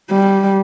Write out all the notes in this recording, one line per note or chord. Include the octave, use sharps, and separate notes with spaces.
G3